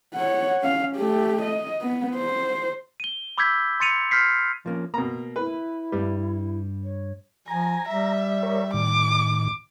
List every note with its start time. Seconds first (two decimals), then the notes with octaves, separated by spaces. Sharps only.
0.15 C#5 F#5
0.61 C#4 F5
0.95 A3 G4
1.42 D#5
1.81 B3
2.15 C5
3.00 D#7 G7
3.38 B5 D6 E6 G6 G#6 B6
3.80 C6 A6 C#7 D#7 F7
4.11 C6 F6 G6 B6 C7
4.66 F3 A#3 C#4
4.94 B2 A#3 A#5
5.36 E4 B4
5.92 G2 G3 B4
6.84 C#5
7.48 F3 G#5 A#5
7.88 G3 E5
8.43 A#4 C#5
8.74 A2 D#3 D6